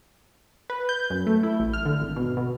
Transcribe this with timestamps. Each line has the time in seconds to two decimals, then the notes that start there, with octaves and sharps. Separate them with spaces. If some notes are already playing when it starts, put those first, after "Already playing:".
0.70 B4
0.89 G6
1.10 F#2
1.27 A3
1.43 E4
1.60 A1
1.73 F6
1.85 D3
2.02 G#1
2.16 B2
2.37 B2